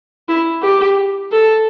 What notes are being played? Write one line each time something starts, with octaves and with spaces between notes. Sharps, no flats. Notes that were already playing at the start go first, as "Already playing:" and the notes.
E4
G4
A4